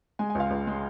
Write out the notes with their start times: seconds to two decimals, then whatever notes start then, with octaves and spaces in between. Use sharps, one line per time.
0.19 G#3 G#5
0.30 G#5
0.35 C#2 F5
0.51 C#2
0.67 G#3